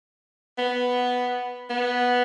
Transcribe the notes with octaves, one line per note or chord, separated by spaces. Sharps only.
B3
B3